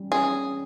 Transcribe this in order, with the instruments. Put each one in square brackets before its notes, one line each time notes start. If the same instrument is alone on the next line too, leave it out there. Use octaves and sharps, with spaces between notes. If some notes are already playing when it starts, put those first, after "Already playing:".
Already playing: [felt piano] G3 C#4
[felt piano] C#4 [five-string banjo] G#4